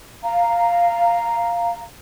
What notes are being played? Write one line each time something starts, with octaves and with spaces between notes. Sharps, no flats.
F5 A#5